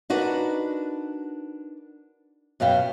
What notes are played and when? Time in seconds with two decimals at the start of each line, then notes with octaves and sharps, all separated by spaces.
0.10 D4 D#4 F#4 A#4 B4
2.60 F#2 B2 F5 G5